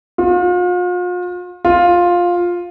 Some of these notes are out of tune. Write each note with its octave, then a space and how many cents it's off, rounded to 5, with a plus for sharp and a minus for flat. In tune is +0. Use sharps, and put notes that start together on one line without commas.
F4 +40
F4 +10